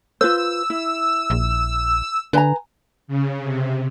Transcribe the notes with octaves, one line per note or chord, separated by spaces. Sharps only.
F4 B4 C5 E6
E4
A#1
D3 B4 G#5 A#5
C#3
C3